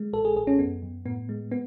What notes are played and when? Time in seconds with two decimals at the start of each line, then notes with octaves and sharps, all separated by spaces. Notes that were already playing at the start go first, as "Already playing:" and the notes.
Already playing: G#3
0.13 A1 A4
0.25 G#4
0.36 A1 G#4
0.47 C#4
0.59 F#2 B3
0.82 F#2
1.05 A2 B3
1.29 G#3
1.51 B3